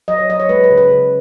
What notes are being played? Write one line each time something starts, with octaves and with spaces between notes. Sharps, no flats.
F#3 D#5
C#5
F#3 D#5
C#5
G#3 B4
B4
C#3
B4
C#3